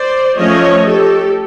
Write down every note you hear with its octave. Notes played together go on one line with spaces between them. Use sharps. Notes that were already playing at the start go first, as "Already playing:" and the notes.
Already playing: C5 D5
F3 A3 C#4 C#5 D#5
G4 A4